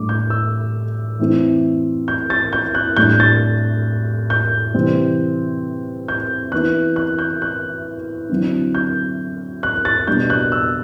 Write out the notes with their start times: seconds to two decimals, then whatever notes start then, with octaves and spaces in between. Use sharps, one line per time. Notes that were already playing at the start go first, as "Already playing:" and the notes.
Already playing: A2 G3 D4 D6
0.09 G6
0.30 E6
1.19 E3 A3 C4 E4
2.08 G6
2.30 A6
2.53 G6
2.75 F#6
2.96 A2 G3 D4 G6
3.20 A6
4.30 G6
4.74 C3 E3 G3 C4
6.08 G6
6.52 E3 B3 E4 F#6
6.96 F#6
7.19 G6
7.42 F#6
8.30 D3 F#3 C4 E4
8.75 G6
9.63 F#6
9.85 A6
10.07 B2 G3 D4 G6
10.30 F#6
10.52 E6